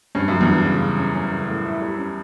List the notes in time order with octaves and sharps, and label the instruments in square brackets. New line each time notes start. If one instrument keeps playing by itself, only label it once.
[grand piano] G2 [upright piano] C#4
[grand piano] F#2 [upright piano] F#3
[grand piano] E2 G2
[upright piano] F#3
C#3
C#3
C#4
C#4
C#3
A2
E4
G3
C#4